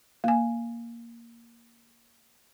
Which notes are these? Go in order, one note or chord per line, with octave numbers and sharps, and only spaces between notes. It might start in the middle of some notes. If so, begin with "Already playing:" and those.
A#3 G#5